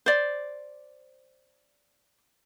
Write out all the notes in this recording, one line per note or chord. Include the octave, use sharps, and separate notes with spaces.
C5 D5